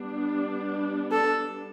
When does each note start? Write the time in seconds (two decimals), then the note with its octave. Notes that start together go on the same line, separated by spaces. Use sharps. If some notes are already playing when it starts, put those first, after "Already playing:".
Already playing: G3 B3 D4
1.11 A4